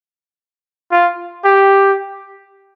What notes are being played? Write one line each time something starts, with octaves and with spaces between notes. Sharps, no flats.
F4
G4